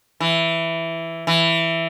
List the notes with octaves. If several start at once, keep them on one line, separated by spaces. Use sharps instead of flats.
E3
E3